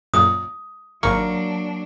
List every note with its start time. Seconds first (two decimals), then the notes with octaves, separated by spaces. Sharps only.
0.14 F#2 A#2 D#6
1.03 G#1 F#3 A#3 D4 C#6